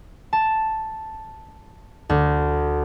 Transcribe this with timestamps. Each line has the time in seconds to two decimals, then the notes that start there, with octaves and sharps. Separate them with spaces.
0.33 A5
2.09 D2